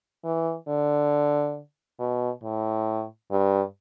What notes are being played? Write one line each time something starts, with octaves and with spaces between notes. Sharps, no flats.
E3
D3
B2
A2
G2